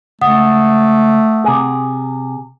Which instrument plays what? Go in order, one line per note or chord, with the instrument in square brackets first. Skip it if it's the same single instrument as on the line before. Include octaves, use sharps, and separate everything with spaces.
[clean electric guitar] C#2 [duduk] A3 [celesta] F#5 D#6
[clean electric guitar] C3 G#4